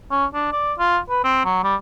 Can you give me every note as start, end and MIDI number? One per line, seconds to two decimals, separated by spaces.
0.11 0.26 61
0.34 0.51 62
0.52 0.73 74
0.79 0.98 65
1.10 1.23 71
1.24 1.41 60
1.45 1.60 54
1.64 1.75 55